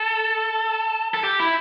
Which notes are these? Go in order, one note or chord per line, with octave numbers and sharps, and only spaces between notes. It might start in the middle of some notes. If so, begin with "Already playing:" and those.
Already playing: A4
A4
G4
E4